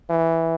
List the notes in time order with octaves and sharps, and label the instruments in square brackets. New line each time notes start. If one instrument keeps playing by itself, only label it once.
[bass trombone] E3